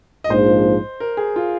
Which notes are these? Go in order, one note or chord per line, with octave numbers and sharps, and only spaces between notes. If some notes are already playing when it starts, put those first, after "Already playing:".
D#5
A#1 G#2 F3 C5
A#4
G#4
F4